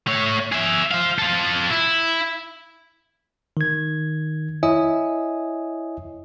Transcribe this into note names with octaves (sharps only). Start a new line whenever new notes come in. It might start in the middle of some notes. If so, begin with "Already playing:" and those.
A3 C#5
G#4 E5
C5 F5
F4 A4
E4
D#3 G#6
E4 C#5 D#5 E5 G#5 D#6